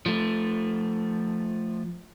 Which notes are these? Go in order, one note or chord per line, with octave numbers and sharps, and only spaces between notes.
F3 A3